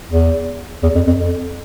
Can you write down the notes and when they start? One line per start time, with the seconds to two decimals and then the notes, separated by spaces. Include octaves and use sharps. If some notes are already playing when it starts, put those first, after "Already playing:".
0.09 E2
0.83 E2
0.95 F2
1.07 F2
1.20 F2